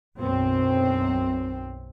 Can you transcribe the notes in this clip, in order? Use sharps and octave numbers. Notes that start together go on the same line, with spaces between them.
B1 F#2 C4